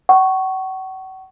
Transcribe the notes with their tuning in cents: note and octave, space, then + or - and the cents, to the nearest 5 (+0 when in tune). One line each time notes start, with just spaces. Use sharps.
F#5 +40 C#6 +0